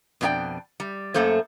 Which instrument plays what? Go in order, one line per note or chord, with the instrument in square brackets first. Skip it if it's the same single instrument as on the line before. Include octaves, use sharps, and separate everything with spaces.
[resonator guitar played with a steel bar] F2 B2 C4 E4 D5 G5
G3
F#2 A3 A#3 A4 C5